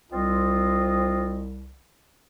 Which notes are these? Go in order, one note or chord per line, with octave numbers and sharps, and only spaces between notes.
C2 C4 F4 D#5